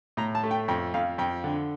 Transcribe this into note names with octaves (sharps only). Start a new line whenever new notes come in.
A2 A#5
A5
A3
G5
F2 G5
F2 F5
F2 G5
D3